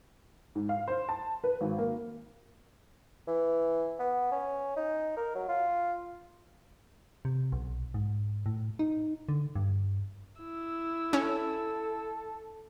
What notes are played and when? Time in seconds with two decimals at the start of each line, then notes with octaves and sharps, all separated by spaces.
0.55 G#2
0.69 F5
0.88 C5
1.09 A5
1.44 B4
1.61 G#1
1.78 A#3
3.27 E3
3.99 B3
4.32 C#4
4.77 D#4
5.17 A#4
5.35 F#3
5.49 F4
7.25 C3
7.52 B1
7.94 G#2
8.46 A2
8.79 D#4
9.29 D3
9.55 G2
10.41 E4 E6
11.13 C#4 A4